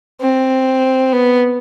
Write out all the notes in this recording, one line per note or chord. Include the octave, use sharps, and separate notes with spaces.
C4
B3